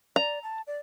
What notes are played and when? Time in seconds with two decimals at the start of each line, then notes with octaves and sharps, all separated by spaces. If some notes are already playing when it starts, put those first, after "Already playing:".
0.16 D5 A#5
0.43 A5
0.67 D5